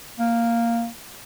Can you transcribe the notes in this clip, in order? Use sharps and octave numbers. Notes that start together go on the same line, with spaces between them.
A#3